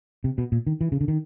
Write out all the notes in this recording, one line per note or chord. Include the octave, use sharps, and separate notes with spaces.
C3
B2
A#2
D#3
E3
C#3
D3
D#3